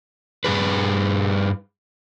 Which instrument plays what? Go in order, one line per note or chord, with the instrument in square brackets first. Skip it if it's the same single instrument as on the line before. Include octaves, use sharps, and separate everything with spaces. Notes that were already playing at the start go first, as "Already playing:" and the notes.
[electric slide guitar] G2 A#2 G#4 B4